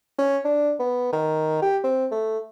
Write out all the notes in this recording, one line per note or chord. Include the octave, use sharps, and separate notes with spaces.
C#4
D4
B3
D#3
G4
C4
A3